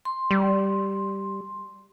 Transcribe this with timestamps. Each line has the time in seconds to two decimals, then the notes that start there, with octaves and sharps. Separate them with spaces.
0.05 C6
0.31 G3